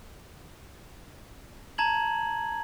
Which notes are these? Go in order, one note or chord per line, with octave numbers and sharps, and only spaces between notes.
A5 A#5 G#6 F#7